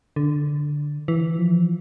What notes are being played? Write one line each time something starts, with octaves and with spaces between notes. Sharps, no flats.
D3
E3
F3